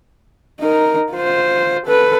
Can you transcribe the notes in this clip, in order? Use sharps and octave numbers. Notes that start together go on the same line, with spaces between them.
D#4 A#4
F4 C5
A4 B4